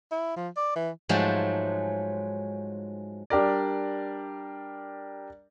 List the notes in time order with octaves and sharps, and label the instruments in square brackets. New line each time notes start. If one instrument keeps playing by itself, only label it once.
[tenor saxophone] E4
F3
D5
E3
[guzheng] G#2 F3 F#3 G#3 A3
[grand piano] G3 D4 G4 A#4 D5